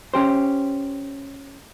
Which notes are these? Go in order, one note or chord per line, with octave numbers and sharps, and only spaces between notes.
C#4 G4 C5